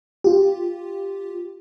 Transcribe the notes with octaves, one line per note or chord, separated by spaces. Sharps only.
F4 G4